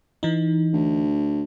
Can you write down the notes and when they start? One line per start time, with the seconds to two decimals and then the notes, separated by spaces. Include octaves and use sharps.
0.23 E3 D#4
0.73 D2